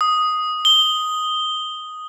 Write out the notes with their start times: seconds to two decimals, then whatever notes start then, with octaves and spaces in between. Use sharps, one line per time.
0.01 D#6
0.65 G7